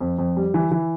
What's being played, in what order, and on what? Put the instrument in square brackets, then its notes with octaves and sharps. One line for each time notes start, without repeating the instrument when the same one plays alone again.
[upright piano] F2
F2
G3
E3
E3